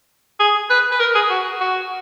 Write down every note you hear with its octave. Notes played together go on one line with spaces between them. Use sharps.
G#4
B4
B4
A#4
G#4
F#4
F#4